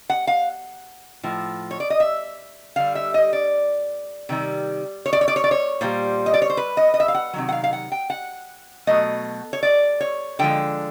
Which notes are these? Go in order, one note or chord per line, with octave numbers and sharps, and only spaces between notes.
F#5
F5
A2 F3
C#5
D5
D#5
E5
D3 G3 F5
E5
D#5
D5
C3 D#3 G3
C#5
D5
C#5
D5
C#5
D5
C#5
A#2 G3 C5
D#5
D5
C#5
C5
B4
D#5
D#5
E5
F5
F#5
C3 D#3 F#3
F#5
F5
F5
F#5
G5
F#5
B2 F#3 A3 D#5
C#5
D5
C#5
D3 F3 G#3 G5